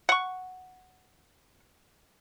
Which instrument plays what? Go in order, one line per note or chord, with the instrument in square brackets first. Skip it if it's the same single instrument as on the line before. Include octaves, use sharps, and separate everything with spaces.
[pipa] F#5 C#6